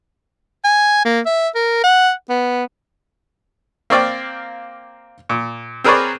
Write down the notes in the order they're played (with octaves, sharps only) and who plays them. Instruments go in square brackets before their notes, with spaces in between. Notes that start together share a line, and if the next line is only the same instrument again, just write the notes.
[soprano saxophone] G#5
A#3
E5
A#4
F#5
B3
[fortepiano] A#3 C4 D5 F5 G5
A#2
C4 G#4 A#4 B4 C#5 D5